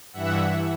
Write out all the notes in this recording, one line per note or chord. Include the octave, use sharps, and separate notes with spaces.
G2 E3 E5 F#5